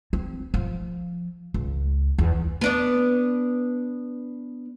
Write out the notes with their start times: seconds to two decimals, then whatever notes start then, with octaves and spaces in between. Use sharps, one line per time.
0.13 C4
0.54 F3
1.54 C#2
2.18 E2
2.61 B3 D4 D5